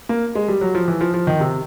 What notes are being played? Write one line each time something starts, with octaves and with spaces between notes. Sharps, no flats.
A#3
G#3
G3
F#3
F3
E3
F3
F3
D#3
C3